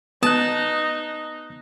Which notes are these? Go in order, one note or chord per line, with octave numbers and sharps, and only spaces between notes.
B3 D#4 A5 D#6 F#6